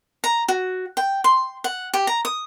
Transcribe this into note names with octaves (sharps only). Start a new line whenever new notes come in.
A#5
F#4
G5
C6
F#5
G4
A#5
D#6